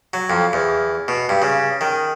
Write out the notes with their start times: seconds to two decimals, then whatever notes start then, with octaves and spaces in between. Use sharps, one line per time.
0.13 F#3
0.30 F2
0.53 E2
1.08 B2
1.29 G2
1.42 C#3
1.81 D#3